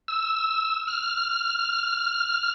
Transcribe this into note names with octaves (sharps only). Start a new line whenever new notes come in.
E6
F6